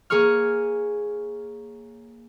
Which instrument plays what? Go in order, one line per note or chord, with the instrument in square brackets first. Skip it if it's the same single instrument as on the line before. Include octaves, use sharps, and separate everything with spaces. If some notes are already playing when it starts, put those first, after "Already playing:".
[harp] A#3 G#4 C#5 C#6 F6